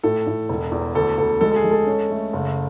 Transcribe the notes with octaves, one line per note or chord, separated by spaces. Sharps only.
A2 A4
A2
E1
E2
D2 A4
D2 A4
G#3 A4
A4
G#4
G#3
A4
C#4
A3
F#1